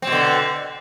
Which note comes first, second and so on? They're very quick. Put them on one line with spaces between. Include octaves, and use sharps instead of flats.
C4 B2 D3